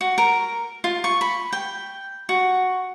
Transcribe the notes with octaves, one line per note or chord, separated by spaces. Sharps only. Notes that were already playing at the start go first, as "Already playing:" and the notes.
F#4
A#4
F4
C#6
B5
G5
F#4